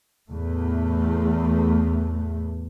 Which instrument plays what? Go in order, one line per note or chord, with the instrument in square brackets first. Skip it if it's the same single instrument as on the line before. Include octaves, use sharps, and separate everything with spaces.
[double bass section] E2 A2 A3